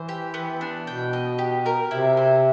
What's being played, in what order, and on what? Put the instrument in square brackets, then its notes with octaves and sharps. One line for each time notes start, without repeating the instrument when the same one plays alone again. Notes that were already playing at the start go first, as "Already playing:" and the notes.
Already playing: [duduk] E3 [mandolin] C5
[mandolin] G4
B3
D4
[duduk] B2 [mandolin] G5
[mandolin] D#5
G4
A#4
[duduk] C3 [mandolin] E4
[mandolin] C5